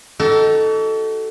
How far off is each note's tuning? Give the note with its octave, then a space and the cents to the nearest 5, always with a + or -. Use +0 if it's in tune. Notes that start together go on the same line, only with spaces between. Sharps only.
D#4 +0 F#4 +40 A4 +0